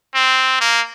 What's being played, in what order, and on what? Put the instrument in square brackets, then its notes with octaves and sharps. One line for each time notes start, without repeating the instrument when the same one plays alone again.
[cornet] C4
A#3